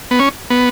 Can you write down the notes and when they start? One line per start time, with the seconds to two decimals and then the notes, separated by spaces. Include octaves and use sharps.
0.11 B3
0.19 C#4
0.50 B3